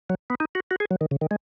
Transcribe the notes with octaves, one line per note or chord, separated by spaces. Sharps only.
F#3
B3
D#4
F#4
F#4
G#4
F#3
D#3
C#3
D#3
G#3